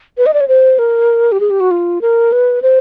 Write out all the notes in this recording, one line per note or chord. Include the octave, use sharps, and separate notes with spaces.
B4
D#5
D5
C#5
C5
A#4
G4
G#4
G4
F#4
F4
A#4
B4
C5